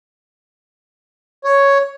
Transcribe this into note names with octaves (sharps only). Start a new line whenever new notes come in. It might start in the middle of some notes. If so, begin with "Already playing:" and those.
C#5